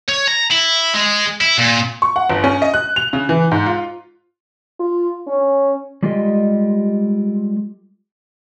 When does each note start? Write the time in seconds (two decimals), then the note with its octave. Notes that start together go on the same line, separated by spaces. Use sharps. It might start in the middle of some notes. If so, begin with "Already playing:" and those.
0.08 C#5
0.27 A#5
0.51 E4
0.94 G#3
1.41 E4
1.58 A#2
2.02 C#6
2.16 F#5
2.29 G1
2.44 C#4
2.62 D#5
2.74 F#6
2.96 F7
3.13 C#3
3.29 E3
3.51 G#2
3.66 F4
4.80 F4
5.28 C#4
6.03 G3 G#3 F4 G4 A4 D#5